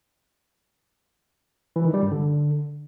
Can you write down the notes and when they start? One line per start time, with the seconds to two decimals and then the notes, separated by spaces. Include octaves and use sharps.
1.76 E3
1.85 D#3
1.94 G3
2.03 G2
2.11 D3